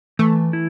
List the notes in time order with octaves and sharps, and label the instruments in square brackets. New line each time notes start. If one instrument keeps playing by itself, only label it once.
[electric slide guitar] E3 [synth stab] A3
[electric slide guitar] E4